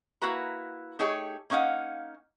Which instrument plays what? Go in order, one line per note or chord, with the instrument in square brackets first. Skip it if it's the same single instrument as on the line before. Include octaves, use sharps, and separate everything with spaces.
[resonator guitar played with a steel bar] A#3 E4 F#4 B4 A#5
A3 D#4 G4 G#4 C#5
A#3 C#4 D#4 F5 F#5